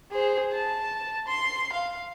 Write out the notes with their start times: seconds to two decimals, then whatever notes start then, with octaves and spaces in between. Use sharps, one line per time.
0.12 G#4 C5
0.52 A5
1.27 C6
1.72 F5